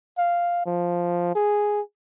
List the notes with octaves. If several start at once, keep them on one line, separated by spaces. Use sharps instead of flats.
F5
F3
G#4